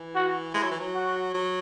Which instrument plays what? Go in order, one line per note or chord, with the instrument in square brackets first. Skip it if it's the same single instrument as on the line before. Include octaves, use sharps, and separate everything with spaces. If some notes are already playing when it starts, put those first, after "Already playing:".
Already playing: [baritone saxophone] E3
[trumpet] F#4
[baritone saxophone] G#3 [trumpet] E4
[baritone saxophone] F#3
E3
F#3
[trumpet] F#4
[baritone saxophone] F#3